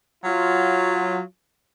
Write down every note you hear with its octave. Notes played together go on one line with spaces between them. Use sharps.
F#3 F4